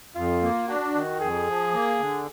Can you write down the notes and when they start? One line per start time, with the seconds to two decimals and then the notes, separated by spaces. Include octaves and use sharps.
0.16 F2 F4
0.42 A#3
0.68 D4 F#4
0.95 D#3
1.20 F2 G#4
1.47 F3
1.74 A#3
1.99 D3